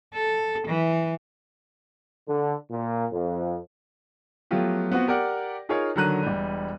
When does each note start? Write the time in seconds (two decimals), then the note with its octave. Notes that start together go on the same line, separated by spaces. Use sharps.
0.15 A4
0.68 E3
2.28 D3
2.70 A#2
3.11 F2
4.51 F3 F#3 A3 B3 F4 G4
4.92 B3 C4 F4 F#4
5.07 G4 A#4 D5 F#5
5.69 D#4 F4 G#4 A#4 C#5 F5
5.96 D3 D#3 F#3 A#5 F#6 D#7
6.23 E1 G3